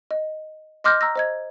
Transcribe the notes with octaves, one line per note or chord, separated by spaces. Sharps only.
D#5
D#5 C6 D6 F6 G6 A#6
A#5 E6 A#6
C5 D#5 G#6